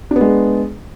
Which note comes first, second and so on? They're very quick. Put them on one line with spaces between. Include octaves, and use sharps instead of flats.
D4 B3 G#3